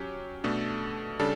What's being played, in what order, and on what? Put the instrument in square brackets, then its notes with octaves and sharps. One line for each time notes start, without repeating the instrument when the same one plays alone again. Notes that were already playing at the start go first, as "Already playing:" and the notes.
Already playing: [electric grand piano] F#3 C#4 G4
B2 A3 D4 A4
C#3 G3 D4 A4